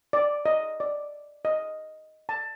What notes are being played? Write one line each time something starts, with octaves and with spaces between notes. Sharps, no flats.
D5
D#5
D5
D#5
A5